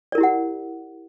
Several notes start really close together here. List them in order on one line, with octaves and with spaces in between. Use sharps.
D5 A#4 E4 G4 F#5